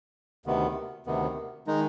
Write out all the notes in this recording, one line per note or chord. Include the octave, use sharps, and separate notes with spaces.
D2 C3 D#3 B3
D2 C3 D#3 B3
D#3 G#3 D#4